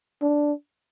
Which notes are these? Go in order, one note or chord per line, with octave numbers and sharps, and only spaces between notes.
D4